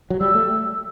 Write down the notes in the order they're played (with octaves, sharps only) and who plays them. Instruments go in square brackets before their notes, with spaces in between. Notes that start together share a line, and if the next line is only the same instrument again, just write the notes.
[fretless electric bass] F#3
[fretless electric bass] G3 [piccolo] E6
[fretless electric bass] A3